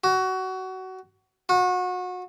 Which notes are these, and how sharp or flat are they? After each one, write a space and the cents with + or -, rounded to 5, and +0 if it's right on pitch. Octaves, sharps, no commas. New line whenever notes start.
F#4 +20
F#4 -30